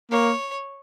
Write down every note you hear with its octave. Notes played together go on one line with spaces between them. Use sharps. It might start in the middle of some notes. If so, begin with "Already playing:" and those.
A#3 C#5